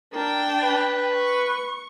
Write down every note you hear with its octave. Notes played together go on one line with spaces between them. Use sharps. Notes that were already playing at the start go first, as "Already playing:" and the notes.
D4 A#4 G5
B4
C#6